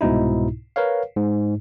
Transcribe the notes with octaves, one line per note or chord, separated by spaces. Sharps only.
C2 G#2 B2 D#4 E4
A#4 B4 C#5 F5
G#2